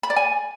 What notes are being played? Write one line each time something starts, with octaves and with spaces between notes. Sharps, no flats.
B5
D5
G#5